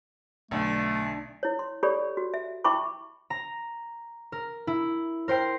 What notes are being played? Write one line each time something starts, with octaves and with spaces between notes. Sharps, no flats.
B1 D3 A3
E4 C#5
C6
G4 A4 C#5 D5 B5
F#4
E5
E4 E5 G5 B5 C#6 D6
A#5
A#4
E4
A#4 C5 G5 C7